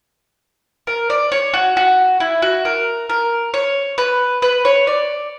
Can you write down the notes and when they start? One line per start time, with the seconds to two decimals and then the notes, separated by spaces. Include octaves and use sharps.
0.87 A#4
1.10 D5
1.32 C#5
1.54 F#4
1.77 F#4
2.20 E4
2.42 F#4
2.65 A#4
3.10 A#4
3.54 C#5
3.98 B4
4.42 B4
4.65 C#5
4.87 D5